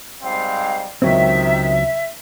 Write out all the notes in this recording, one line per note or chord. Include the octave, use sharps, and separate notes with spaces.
G#2 G3 C4 F5
C#2 C3 D#3 F#3 C4 E5